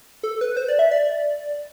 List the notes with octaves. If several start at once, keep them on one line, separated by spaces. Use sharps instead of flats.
A4
B4
C5
D5
E5
D5